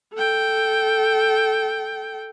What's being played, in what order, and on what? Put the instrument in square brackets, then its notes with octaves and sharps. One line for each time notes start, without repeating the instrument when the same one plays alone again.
[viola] A4 G5